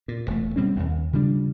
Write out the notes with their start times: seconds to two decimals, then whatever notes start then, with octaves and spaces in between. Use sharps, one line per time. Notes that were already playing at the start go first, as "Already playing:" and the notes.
0.08 A#2
0.27 E1 A3
0.56 B2 G3 C4 C#4
0.75 D#1 D#2
1.13 C#3 F3 G3 D4